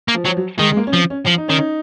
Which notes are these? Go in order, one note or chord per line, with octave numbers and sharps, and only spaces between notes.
A#3
F3
F3 F#3
F#3
D#3 G#3
G#3
A#3
C#4
F3 C4
C#4
F3
D#4
D#3 C#4
D#4